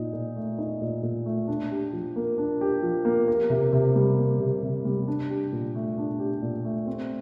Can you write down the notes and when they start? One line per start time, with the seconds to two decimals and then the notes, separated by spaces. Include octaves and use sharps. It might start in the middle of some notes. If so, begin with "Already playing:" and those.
Already playing: A#2 D#4
0.13 A#2
0.36 A3
0.58 D#4
0.82 A#2
1.03 A#2
1.26 A3
1.48 D4
1.71 G4
1.93 F3
2.16 A#3
2.38 D4
2.61 G4
2.83 F3
3.05 A#3
3.28 A#3
3.50 C3
3.73 C3
3.96 G3
4.18 A#3
4.40 C3
4.63 C3
4.85 G3
5.08 D4
5.30 G4
5.52 A#2
5.75 A3
5.98 D4
6.19 G4
6.42 A#2
6.65 A3
6.87 C4